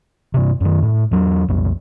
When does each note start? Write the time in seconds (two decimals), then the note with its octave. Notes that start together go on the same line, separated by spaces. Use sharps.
0.34 G2 C3
0.61 F#2 D#3
0.82 A2
1.11 E2 F#3
1.49 B1 F2